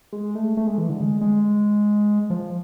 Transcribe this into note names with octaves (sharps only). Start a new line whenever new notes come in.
G#3
A3
A3
G#3
E3
D3
G#3
G#3
F3